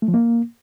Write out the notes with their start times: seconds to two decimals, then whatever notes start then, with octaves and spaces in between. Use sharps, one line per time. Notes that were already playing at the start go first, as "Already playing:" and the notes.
0.02 A3
0.08 F3
0.14 A#3